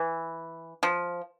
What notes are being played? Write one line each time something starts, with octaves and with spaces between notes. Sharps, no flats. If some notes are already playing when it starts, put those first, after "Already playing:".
Already playing: E3
F3